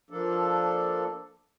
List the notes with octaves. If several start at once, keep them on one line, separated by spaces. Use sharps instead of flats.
F3 A#3 D4 A4